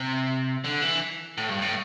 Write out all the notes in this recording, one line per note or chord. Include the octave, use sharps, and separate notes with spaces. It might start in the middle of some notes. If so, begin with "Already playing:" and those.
Already playing: C3
D3
E3
A2
G2
A2